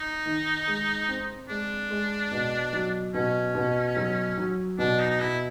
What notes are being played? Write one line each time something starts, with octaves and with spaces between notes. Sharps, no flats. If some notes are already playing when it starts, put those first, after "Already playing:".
Already playing: D#4
D#3
G#3
C4
G#3 D4
G#3
B2
F#3
B2 C#4
B2
F#3
F#3
B2 D4
D#4
D#4
B2 E4